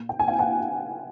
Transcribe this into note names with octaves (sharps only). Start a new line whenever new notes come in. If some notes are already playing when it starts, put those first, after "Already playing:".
Already playing: A#2
G5
G#5
F5 G5
F#5 G#5